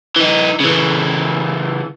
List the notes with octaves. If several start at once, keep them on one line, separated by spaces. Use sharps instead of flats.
E3 D#4
C#3 E3